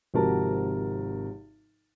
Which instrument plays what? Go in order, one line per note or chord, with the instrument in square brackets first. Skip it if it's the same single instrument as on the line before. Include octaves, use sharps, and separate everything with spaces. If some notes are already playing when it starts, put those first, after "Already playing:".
[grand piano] G#1 C3 F3 F#4 A#4 A5